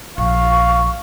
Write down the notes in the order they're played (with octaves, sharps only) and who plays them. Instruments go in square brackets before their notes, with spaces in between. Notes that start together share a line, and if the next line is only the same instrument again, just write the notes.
[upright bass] A#1 [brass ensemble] F5 [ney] C#6